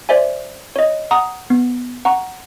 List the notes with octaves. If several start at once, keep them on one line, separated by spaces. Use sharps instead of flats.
C5 D5 E5 G#5
C#5 D#5
F#5 A#5 D#6
B3
F#5 A#5 C#6